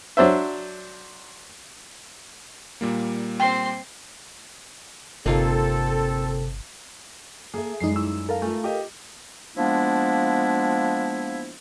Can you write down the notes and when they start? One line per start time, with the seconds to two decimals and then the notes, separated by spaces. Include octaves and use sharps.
0.17 F#3 D4 C5 E5
2.81 A#2 G3 A#3
3.40 C4 G5 C6
5.26 G1 C3 A#3 C4 D#4 F4 A4
7.54 A#3 G#4 A4 E5
7.80 F#2 G3 G#3 D#4 C7
7.96 D#4 E4 E6
8.29 A4 A#4 F5
8.42 A3 F4 G#5
8.64 G4 D#5
9.56 F3 G#3 A#3 B3 D4 E4